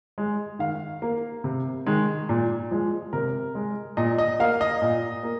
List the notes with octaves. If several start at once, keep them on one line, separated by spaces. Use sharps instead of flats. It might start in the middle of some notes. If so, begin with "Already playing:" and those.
G#3
D#3 F5
A#3
C3
D#3 G#3
A#2
F3 G#3
C3 A#4
G#3
A#2 D#5
D#5
A#3 F5
D#5
A#2
A#3